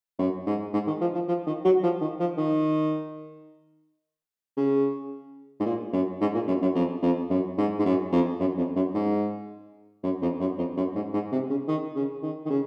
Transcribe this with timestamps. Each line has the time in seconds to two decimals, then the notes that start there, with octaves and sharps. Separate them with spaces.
0.19 F#2
0.46 G#2
0.73 G#2
0.87 D#3
1.01 F3
1.14 F3
1.28 F3
1.46 D#3
1.65 F#3
1.83 F3
2.01 D#3
2.19 F3
2.37 D#3
4.57 C#3
5.60 G#2
5.65 A#2
5.93 F#2
6.21 G#2
6.34 A#2
6.47 F#2
6.62 F#2
6.75 F2
7.02 F2
7.30 F#2
7.58 G#2
7.79 G#2
7.85 F#2
8.12 F2
8.40 F#2
8.57 F2
8.75 F#2
8.94 G#2
10.03 F#2
10.22 F2
10.40 F#2
10.58 F2
10.76 F#2
10.95 G#2
11.13 G#2
11.32 C3
11.49 C#3
11.68 D#3
11.95 C#3
12.23 D#3
12.45 D#3
12.50 C#3